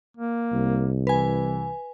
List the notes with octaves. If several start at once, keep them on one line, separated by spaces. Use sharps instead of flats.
A#3
C2
E3 B4 G#5